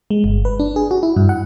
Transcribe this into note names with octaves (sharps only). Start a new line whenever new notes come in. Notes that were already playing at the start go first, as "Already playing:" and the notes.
G#3
G1
B4
D4
G#4
F#4
E4
G2
F#5